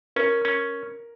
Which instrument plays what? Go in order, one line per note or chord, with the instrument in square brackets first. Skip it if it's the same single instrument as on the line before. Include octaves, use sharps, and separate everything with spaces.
[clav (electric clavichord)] C#4 [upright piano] A#4
[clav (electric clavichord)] C#4